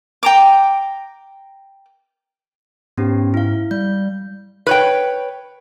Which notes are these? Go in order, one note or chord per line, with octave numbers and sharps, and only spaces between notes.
G5 A#5 D6
G#2 B3 C#4 G4
E4 F5
G3 G6
B4 C#5 G5